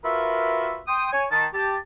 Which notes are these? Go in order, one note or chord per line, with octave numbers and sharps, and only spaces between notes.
F4 F#4 A#4 B4 E5
G5 C6 D#6
C#5 G#5
D#3 A5
G4 A5